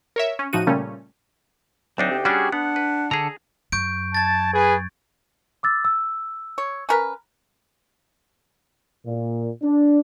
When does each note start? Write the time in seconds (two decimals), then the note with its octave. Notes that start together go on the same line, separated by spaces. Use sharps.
0.16 A#4 C#5 E5
0.39 C#4
0.53 A2 F3 D#4 F#4 D#7
0.67 A#2 C#3 G3 A3 C#4
1.98 D2 F#3 C4 D4 D#4
2.11 G4
2.25 G3 C#4 D4 F#4 G#4
2.52 B3 D4 F#5
2.76 B4
3.11 D3 G#4 A4 A#5
3.72 F#2 C#6 G6 D7
4.15 A5 G#6 A6
4.54 G#4 B4
5.63 D6 E6 A6
5.85 E6
6.58 C#5
6.89 C#4 A#4 B4
9.06 A#2
9.63 D4